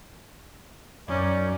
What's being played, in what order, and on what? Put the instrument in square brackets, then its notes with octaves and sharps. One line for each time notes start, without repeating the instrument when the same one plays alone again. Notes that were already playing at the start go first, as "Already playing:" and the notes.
[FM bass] F#2 [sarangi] C#4 [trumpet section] D#4 D5